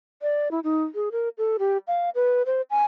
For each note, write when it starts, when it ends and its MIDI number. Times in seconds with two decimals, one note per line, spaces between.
0.22 0.51 74
0.51 0.60 64
0.64 0.83 63
0.95 1.09 68
1.12 1.29 70
1.38 1.57 69
1.59 1.78 67
1.87 2.10 77
2.15 2.43 71
2.46 2.62 72
2.70 2.85 80